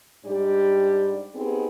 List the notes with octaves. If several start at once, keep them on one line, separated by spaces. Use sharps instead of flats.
G#2 G3 D4 G4 D5
B3 C4 D#4 G4 G#4